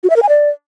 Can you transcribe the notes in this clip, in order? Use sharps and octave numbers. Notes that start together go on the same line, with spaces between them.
F#4
E5
A#4
G#5
D5